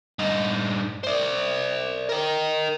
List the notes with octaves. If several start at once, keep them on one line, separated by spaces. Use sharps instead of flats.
G2 D#4
C5 D5
A#4 D#5